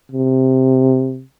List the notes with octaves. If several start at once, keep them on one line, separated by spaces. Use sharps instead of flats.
C3